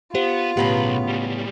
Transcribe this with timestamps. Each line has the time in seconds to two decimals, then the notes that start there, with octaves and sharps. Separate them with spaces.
0.15 B3 F4 G4 C5
0.57 B1 A2 C#3 B3 G4 B5
1.08 G3 G#3